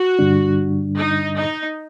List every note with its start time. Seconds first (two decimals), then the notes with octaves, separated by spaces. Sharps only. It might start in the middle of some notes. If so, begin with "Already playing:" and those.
Already playing: F#4
0.19 G2 D3 G3 D4
0.97 D#4
1.36 D#4